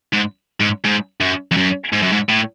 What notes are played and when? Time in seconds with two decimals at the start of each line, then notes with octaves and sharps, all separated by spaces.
0.13 G#2
0.61 G#2
0.85 G#2
1.21 F#2
1.51 F2
1.57 F#2
1.93 G#2
2.02 F#2
2.12 G#2
2.29 A2